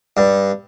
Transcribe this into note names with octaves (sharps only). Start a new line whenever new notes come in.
G2